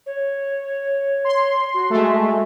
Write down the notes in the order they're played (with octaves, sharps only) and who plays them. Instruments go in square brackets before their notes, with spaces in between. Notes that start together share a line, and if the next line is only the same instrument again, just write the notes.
[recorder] C#5
[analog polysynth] C6
[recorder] F#4
[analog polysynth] G#3 A3